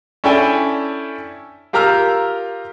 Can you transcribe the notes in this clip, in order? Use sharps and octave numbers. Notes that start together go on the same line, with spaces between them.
C#4 D4 E4 A4 G5 G#5
F4 G4 A#4 A#5 E6 F6